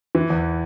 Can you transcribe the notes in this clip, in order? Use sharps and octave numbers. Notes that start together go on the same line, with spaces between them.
E3
E2